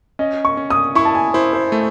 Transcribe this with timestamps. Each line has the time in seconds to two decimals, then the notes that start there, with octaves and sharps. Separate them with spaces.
0.19 C#4 D#5
0.45 C#6
0.57 C#4
0.70 D#6
0.95 E4 C#6
1.05 A5
1.15 G#5
1.34 E4 C5
1.53 C5
1.72 A3